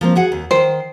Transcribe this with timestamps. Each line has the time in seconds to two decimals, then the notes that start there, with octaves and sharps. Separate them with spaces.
0.01 F3 A#3 C4
0.16 F#4 G#4 F#5
0.32 D#2
0.51 D#3 C5 G5